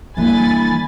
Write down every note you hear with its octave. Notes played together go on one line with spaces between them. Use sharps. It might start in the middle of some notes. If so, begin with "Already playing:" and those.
D3 E3 G3 A#3 G#5 B5 A6